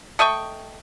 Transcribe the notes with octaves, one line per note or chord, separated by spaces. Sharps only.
A3 D#5 G5 C#6